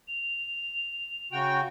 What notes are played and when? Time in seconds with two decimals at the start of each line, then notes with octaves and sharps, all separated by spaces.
0.08 F7
1.32 C#3 F#4 G5